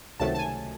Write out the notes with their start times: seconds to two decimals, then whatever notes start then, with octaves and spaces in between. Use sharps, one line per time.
0.20 C#2 C3 D#3 F#3 A3 A5
0.35 A5
0.39 G#5